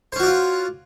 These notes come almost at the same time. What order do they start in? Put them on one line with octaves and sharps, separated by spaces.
C5 C#4 F#4 D5 F4